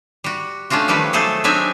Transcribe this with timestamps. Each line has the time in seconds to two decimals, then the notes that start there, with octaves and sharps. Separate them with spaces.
0.24 G3 F#4
0.70 A3 C#4 D4 F4 F#4
0.88 D#3 F3 G3 A3 B4
1.13 F#3 A3 G#4 A4 C5
1.44 F#3 C4 D4 D#4 E5 G#5